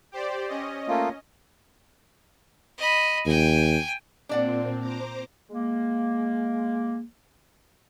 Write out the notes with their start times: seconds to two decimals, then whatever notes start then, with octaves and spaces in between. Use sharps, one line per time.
0.12 G4 C5 D5
0.49 C#4 D#5
0.88 A3 A#3 F4
2.78 D#5 B5
3.26 D#2 G5 G#5
4.29 A#2 C4 D4 D5 F#5
4.80 C5 A#5 D6
5.50 G#3 A#3